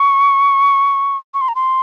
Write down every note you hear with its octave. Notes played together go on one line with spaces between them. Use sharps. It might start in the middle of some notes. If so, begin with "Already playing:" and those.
Already playing: C#6
C#6
C6
A#5
C6